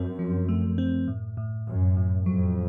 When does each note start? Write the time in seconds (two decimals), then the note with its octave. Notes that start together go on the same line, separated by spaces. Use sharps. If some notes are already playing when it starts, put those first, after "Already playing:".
Already playing: F#2 C4
0.19 F3
0.49 A3
0.78 C4
1.07 A2
1.37 A2
1.67 F#2 A2
1.97 A2
2.26 F2 F#3